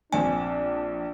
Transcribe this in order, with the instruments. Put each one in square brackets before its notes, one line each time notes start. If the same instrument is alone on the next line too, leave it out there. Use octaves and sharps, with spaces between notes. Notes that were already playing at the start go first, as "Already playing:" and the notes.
[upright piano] A#1 C4 [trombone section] D4 [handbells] G#5